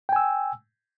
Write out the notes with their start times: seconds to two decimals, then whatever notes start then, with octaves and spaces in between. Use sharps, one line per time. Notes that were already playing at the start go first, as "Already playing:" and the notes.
0.09 G5
0.13 G#5
0.16 E6